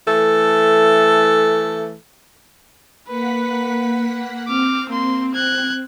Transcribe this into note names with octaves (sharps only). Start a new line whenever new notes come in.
E3 A3 A4
A#3 B4 F#5 B6
C4 D6 F6
A#3 C6
F#6 G#6